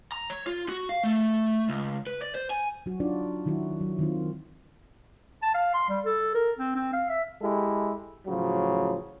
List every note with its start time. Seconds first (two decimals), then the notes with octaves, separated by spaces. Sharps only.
0.12 A#5
0.30 C#5
0.47 F4
0.69 F#4
0.89 F5
1.04 A3
1.69 C#2
2.07 B4
2.22 D5
2.35 C5
2.50 G#5
2.86 F#3 F#4
3.00 D4 D#4 F4 F#4 D5
3.46 D#3 F#3 E4 F#4
3.81 F#3
3.99 D#3 C4 F4
5.43 A5
5.55 F5
5.74 C6
5.89 G3
6.05 A4
6.35 A#4
6.59 C4
6.76 C4
6.93 F5
7.09 E5
7.42 G#3 E4 G4 A4
8.26 A2 C#3 F3 F#3